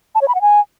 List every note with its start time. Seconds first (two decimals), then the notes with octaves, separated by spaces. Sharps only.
0.15 A5
0.22 C#5
0.28 B5
0.35 F#5
0.41 G#5